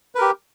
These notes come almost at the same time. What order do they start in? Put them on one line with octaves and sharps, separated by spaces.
B4 A#4 G4